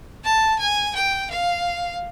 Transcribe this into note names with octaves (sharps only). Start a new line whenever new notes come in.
A5
G#5
G5
F5